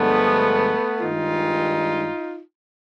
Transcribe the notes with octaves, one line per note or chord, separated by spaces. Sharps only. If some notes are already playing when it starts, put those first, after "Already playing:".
Already playing: G2 D3 F3 G#3 A3 B3
G2 D#3 G#3 D#4 F4